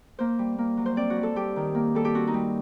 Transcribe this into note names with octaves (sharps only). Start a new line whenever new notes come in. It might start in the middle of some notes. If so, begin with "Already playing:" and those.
A#3 C5
G3
A#3
F#3
C5
C4 D5
F#4
G3
A4
G3 G4
D#3
A#3
G3 A4
G4
C4 F#4
D#4
G3